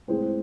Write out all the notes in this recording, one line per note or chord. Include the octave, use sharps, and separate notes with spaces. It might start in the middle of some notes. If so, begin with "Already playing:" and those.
A2 G#3 C4 C5